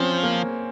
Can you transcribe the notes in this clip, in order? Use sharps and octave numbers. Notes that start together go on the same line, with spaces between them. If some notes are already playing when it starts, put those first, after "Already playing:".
Already playing: F3 C4 C#4
A#3